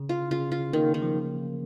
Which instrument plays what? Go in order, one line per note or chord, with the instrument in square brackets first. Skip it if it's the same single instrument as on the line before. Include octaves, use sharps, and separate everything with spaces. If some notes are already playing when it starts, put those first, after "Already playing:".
Already playing: [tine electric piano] C#3
[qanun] F4
[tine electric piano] C#3 [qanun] F4
[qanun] F4
[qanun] D#3 [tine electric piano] A#3
[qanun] D#3
[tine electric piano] F3